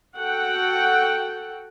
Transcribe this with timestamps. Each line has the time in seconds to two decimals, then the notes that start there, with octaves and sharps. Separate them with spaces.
0.17 F#4 A4 F#5 G5